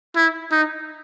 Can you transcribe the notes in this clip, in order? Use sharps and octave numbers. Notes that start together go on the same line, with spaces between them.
E4
D#4